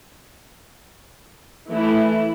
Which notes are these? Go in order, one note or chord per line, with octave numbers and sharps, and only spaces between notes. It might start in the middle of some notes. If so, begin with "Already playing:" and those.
E3 A3 E4